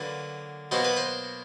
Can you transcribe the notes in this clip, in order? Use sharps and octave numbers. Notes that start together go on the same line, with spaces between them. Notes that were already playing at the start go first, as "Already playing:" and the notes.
Already playing: D3 F#3 A#3 B4
B2 F#3 A#3 C5
B4
C5